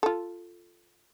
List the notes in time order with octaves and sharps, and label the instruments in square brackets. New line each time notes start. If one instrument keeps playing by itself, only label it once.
[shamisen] F4 A4